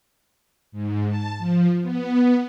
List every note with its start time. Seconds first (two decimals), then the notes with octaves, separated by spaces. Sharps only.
0.72 G#2
1.08 A5
1.38 F3
1.81 B3